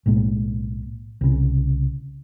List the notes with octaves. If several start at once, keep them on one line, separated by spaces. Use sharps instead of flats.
B1 A2 G#3 A#3
C2 C#3